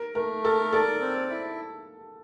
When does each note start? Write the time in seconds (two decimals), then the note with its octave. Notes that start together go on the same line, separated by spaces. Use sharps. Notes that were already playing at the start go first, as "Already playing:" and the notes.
Already playing: A#4
0.15 A3 A#4
0.44 A4 A#4
0.72 A4 D5
1.01 C4
1.30 E4